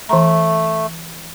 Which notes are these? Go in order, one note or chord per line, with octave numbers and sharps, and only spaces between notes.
E3 A3 A#5